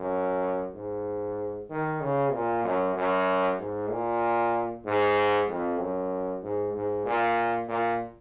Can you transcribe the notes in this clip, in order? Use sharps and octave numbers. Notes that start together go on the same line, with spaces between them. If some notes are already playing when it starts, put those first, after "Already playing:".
Already playing: F#2
G#2
D#3
C#3
A#2
F#2
F#2
G#2
A#2
G#2
F2
F#2
G#2
G#2
A#2
A#2